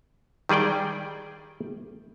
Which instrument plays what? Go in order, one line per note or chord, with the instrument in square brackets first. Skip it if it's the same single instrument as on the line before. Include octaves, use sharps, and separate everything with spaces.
[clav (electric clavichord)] D#3 G3 G#4 D5 G5